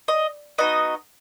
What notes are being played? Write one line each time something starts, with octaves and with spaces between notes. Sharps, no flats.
D#5
B3 D#4 F#4 D#5